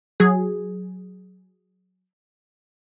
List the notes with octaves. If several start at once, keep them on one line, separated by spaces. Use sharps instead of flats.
F#3 G#4